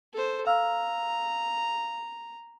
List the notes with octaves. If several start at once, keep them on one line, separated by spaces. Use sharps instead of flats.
A4 C5
F5 A#5 E6 F6